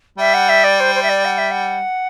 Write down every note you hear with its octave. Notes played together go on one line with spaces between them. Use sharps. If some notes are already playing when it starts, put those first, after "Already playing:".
G3 E5
F#5
E5
D5
C5
C5
E5
D5
F#5
E5
F#5